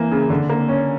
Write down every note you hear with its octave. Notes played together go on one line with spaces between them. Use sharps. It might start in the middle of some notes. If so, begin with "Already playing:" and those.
Already playing: E3 A#3
C#3
D3
A#3
C#4